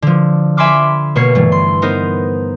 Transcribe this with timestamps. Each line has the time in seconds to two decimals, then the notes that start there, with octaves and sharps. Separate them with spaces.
0.02 D3 F3
0.57 E5 G#5 B5 C6 D6 F6
1.16 B2 A#3 C#5 C7
1.35 G2 E3 A3
1.52 C6
1.82 B3 D#4 A#4 C5